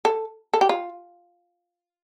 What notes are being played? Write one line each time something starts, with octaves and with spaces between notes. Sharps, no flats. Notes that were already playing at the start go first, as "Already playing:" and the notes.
A4
A4
G4
F4